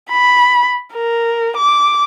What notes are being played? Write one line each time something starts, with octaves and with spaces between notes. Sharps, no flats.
B5
A#4
D6